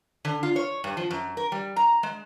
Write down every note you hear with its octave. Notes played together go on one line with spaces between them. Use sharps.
D3
F4
C#5
G2
F3
F#2
A#4
G3
A#5
G#3